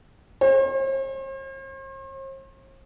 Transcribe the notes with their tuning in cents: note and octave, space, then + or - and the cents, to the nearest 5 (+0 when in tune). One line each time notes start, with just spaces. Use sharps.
C5 +45